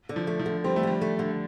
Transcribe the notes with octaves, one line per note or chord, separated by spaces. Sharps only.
D3
F3
A3
F3
D3
G3 C4
A3
D3 G3
A3
D3